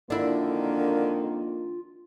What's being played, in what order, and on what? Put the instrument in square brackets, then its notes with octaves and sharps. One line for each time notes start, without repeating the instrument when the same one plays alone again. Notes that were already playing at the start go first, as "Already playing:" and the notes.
[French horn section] F2 D#3 A#3 [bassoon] D3 [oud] D4 E4 [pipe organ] F4